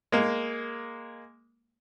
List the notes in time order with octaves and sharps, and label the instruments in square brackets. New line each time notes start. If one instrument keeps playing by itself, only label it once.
[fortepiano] G#3 A#3